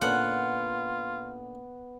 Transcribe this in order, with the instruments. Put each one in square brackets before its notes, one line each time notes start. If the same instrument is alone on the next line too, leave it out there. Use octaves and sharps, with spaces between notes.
[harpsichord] A#2 D3 C#4 [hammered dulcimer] B3 [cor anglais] F4 [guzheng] F#5